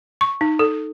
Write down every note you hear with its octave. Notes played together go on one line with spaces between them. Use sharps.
C#6
D#4
A4